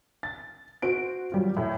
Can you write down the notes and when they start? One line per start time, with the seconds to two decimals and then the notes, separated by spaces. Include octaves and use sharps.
0.23 A6
0.82 F#4 C5 D7
1.32 F#3 G3 F4
1.56 E2 A2